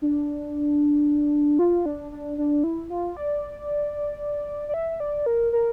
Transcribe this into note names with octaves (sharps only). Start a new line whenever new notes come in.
D4
F4
D4
D4
D4
E4
F4
D5
D5
E5
D5
A#4
A#4